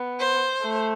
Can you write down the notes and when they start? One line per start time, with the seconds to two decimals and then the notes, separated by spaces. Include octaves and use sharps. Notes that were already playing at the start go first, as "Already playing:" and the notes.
Already playing: B3
0.19 C5
0.62 A3